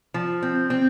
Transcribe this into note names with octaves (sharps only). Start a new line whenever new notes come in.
F3
C4
C4